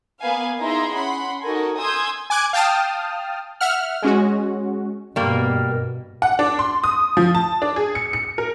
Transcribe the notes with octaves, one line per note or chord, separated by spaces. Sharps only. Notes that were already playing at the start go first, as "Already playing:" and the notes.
A#3 B3 B4 F5 G#5
D#4 E4 G#4 E5 A#5 C6
C#4 F#5 B5 C6
D#4 F#4 A4 A#4 G#5
G#5 C6 D#6 E6 G6 G#6
G#5 D6 F#6 G#6
F5 G5 A5 D#6 F6
E5 F#5 F6
G#3 C#4 F#4
G2 B2 G3 A#3
F#5
D4
C6
D#6
F3
A5
D4
G#4
C#7
C#7
A#4